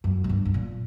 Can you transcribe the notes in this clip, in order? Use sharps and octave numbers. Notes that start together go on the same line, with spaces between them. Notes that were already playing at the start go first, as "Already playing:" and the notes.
F#2
A#2
G2
G2
A#2